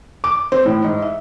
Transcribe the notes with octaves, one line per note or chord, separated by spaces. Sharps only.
D6
C4
A2
G#2
E5